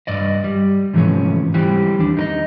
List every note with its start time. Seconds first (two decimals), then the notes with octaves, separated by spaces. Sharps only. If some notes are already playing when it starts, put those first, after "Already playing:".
0.07 G2 D5 D#5
0.44 G3
0.93 G#2 C3 E3 F3 A3 C#4
1.54 E3 G3 C4 G4
1.99 D#2 D4
2.17 D#4 A#4 D#5